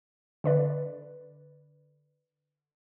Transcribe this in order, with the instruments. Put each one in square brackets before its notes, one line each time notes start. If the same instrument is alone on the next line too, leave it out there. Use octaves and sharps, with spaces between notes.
[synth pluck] D3 B4 D5